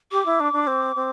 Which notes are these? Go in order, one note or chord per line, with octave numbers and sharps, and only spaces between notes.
G4 D6
E4
D4
D4
C4
C4